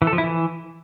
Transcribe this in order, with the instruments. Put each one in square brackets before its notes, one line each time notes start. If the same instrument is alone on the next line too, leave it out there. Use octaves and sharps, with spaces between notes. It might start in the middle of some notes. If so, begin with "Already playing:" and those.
[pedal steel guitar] E3
A4
F3
E4
E3